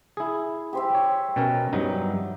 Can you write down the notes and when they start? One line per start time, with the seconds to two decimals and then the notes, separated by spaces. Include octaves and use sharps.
0.17 E4 G#4
0.73 G4 C5 E5
0.95 C#5
1.36 B2 C#4 A#4 B5
1.73 G2 F#3 D#4